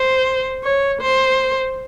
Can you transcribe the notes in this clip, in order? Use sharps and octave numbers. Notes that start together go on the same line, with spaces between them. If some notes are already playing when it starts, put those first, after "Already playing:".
Already playing: C5
C#5
C5